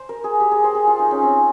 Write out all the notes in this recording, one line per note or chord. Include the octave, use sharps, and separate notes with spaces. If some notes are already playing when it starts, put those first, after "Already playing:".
Already playing: C5
A#4
G#4
G4
G#4
C5
G#4
F4
D#4
C#4
C4